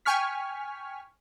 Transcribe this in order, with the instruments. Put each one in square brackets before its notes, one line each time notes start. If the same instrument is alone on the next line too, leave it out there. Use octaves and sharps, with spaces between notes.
[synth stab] G5 G#5 C#6 F6 B6